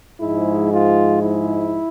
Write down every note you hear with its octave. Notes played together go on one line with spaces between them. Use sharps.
G#2 F3 G#3 E4
F4
E4